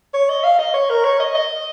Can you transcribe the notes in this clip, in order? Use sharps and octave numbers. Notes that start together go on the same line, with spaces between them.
C#5
D#5
F5
D#5
C#5
A#4
C#5
D#5
D#5